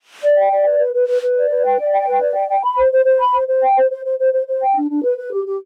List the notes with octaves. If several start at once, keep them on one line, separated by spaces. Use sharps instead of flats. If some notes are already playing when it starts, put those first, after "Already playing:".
D5
G5
D5
B4
B4
B4
B4
B4
D5
B4
G5
D5
G5
B4
D5
G5
G5
B5
C5
C5
C5
B5
C5
C5
G5
C5
C5
C5
C5
C5
C5
G5
D4
D4
B4
B4
G4
G4